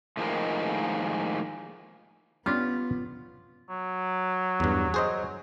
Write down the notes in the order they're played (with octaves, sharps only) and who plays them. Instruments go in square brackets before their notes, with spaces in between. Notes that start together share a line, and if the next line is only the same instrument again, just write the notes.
[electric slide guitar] A2 D#3 F3 G#3 A#3
[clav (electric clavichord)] G3 C#4 D4 [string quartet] B3 [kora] F4
[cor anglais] F#3
[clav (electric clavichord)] E2 G2
G#4 C5 D#5